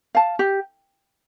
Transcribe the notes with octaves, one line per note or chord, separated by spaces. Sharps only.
F5 A5
G4